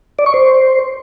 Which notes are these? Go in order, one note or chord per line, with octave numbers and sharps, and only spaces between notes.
D5
C#6
C5